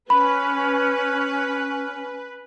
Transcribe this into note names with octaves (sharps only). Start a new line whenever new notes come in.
C#4 B4 B5